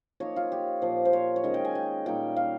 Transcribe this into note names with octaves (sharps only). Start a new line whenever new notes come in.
F3 A#3 D#4 C#5
F4
G4
A#2 F3 A#3 C5
C5
C#5
C#5
D#3 G#3 C#4 D#5
G5
G#5
G5
A#2 G3 A#3 D#4 G5
F5